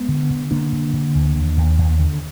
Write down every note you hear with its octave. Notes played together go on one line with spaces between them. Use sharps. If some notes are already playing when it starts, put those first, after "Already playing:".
Already playing: G#3 B3
D3
D3
D3 A#3 D4
D3
D3
D2
D#2
D#2
D#2
D3